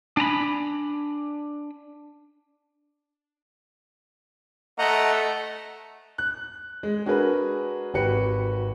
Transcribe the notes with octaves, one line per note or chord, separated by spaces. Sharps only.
D4 G#5 A#5 B5
A3 D#5 F#5 A#5
F#6
G#3
D4 F#4 G#4 A#4 B4
G#1 F#4 G4 B4 C#7